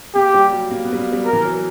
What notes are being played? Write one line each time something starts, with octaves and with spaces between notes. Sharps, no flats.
A#3 G4
G3
F#3
A#3
B3
G3
A#3
G3
A#4
E3
F#3